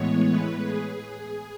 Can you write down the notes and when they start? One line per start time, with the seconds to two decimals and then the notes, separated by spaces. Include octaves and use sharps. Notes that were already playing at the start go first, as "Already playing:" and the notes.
Already playing: A2 E3 G#3 B3 C#5
0.28 B4
0.65 G#4